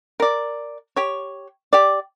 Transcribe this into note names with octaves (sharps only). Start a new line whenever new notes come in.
A#4 D5
G4 C#5
G4 D5